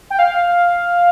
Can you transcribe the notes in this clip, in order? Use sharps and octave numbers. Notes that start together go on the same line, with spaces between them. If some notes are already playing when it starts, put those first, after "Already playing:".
G5
F5